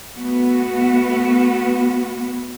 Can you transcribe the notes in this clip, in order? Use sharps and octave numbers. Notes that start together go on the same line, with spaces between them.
A3 B3 F#4 B4